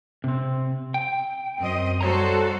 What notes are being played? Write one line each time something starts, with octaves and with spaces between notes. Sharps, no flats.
C3 C4
G5
F#2 C4 D#5
G3 F#4 A4 C5 C#5 A#5